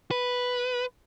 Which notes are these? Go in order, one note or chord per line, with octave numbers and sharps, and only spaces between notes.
B4